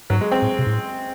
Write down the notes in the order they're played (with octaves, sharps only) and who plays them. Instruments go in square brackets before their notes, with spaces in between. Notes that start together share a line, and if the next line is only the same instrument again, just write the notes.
[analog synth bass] G#2 [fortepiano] F#3
[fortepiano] G#3
C4
[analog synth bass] A2
C3
A2